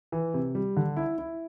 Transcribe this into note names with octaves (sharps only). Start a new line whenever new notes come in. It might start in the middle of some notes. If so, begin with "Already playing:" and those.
E3
C3
G3
D3
E4
E4